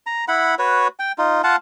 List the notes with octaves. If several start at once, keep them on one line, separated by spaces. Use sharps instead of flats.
A#5
E4 F#5 B5
F#4 B4 C#5
G5
D#4 F4
F4 F5 F#5 A5